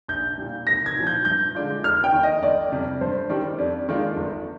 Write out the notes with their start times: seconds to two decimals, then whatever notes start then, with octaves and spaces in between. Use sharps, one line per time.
0.08 A#1 G6
0.38 A#2 G3
0.67 C2 A#6
0.86 G#6
0.96 A#2 F3
1.07 G6
1.25 G2 G6
1.55 D3 G#3 D4 F4
1.84 F1 F6
2.04 G5
2.13 D#2 D#3
2.23 D#5
2.42 G1 D5
2.72 F2 C3 G3
3.01 G2 C5
3.29 D#3 G3 D4 G4
3.58 F2 D5
3.89 D#3 G#3 D4 F4
4.17 G1